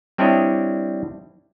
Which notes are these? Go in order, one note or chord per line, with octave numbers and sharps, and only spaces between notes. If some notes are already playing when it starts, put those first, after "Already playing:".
G3 C4 D4 E4 C#5 D#5